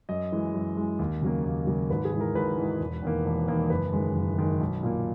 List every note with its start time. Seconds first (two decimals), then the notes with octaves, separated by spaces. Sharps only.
0.09 F#2 D#5
0.32 E3 G#3
0.54 F#2
0.77 E3 G#3
0.99 D#2
1.22 C#3 F#3 A#3
1.44 D#2
1.67 C#3 F#3 A#3
1.90 G#1 B4
2.05 G#4
2.13 G#2 E3
2.21 A#4
2.35 G#1 B4
2.57 G#2 E3
2.80 E1
3.03 E2 D#3 A#3
3.26 E1
3.48 E2 D#3 A#3
3.70 F#1 B4
3.93 F#2 D#3 G#3
4.16 F#1
4.38 F#2 D#3 G#3
4.61 B1
4.83 A#2 A#3